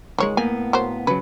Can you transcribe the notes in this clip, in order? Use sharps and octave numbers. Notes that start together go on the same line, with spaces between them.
C#2 D#3 G#3 C#5
A2 A#3 B3 G#5
F#3 A#4 C5
C#3 F#3 B4